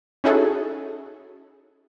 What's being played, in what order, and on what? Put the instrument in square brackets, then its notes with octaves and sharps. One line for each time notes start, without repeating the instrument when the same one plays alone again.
[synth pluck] C#4 D#4 E4 F#4 G#4 A4